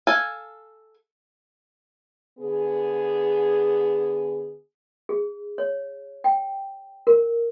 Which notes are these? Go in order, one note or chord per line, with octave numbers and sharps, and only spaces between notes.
A4 F5 G#5
D3 B3 G#4
G#4
C#5
G5
A#4